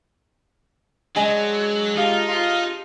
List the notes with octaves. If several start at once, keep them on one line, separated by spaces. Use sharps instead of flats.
F#3 G#3 D4 D#5 G#5
D#4 F4 G4 D#5 A5
F4